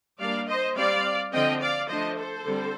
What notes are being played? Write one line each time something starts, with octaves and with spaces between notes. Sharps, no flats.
G3 A#3 D4 D5 F5
C5 D#5
G3 C4 D5 F5
D3 F3 C4 D#5 G5
D5 F5
F3 A3 D4 C5 D#5
A4 C5
D3 G3 C4